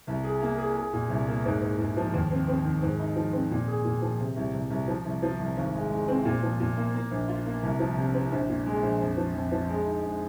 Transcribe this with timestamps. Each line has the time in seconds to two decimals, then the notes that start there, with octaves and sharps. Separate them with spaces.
0.07 C2
0.24 G#4
0.42 A#3
0.58 G#4
0.76 G#4
0.93 A#2
1.10 C2
1.28 A#3
1.45 G#2
1.61 G#2
1.79 G#2
1.97 F3
2.14 D#2
2.31 C4
2.48 C4
2.64 D#3
2.82 G#2
3.00 D#4
3.16 F3
3.33 C4
3.51 A#2
3.68 G#4
3.85 A#2
4.02 F3
4.19 C3
4.36 C2
4.54 C2
4.70 C2
4.88 F3
5.05 C2
5.22 F3
5.40 C2
5.56 G#1
5.74 G#3
5.90 G#3
6.08 C4
6.25 A#2
6.43 F3
6.60 A#2
6.77 A#3
6.94 A#3
7.11 A#1
7.28 F4
7.46 A#3
7.63 C2
7.79 F3
7.97 C3
8.14 C4
8.32 A#1
8.49 A#2
8.66 G#3
8.83 A#1
9.00 F2
9.17 F3
9.35 F2
9.52 F3
9.69 G#3
9.86 D#4
10.03 G#3